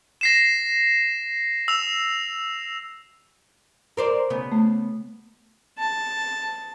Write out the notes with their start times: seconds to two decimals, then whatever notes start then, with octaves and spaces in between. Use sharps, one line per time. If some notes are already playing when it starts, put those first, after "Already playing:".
0.21 A#6 C7 E7
1.68 E6 F7
3.97 A#4 C5 D5
4.30 C#3 B3
4.52 A3
5.79 A5